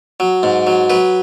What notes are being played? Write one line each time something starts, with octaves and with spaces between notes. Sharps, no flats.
F#3
G#2
F#3
F#3 B4